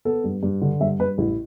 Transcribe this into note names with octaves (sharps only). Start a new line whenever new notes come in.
B3 A4
G2
G2
D3
G2 E5
G2 B4
A1 E4